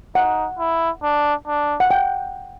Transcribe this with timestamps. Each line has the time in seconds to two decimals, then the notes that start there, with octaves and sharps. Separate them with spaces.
0.15 D#4 F#5
0.59 E4
1.03 D4
1.47 D4
1.80 F#5
1.91 G5